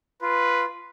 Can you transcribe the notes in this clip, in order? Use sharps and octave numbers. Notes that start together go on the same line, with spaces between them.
F4 B4